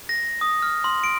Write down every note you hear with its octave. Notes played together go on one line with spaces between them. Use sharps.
A#6
D#6
F6
C6
D7